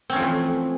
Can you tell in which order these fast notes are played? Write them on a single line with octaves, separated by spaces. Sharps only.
C4 C#4 F3 A3 E3